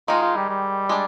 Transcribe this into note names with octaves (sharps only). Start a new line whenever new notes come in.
D#3 G#3 D#4 F4
F4
G3
G3
G#3 D4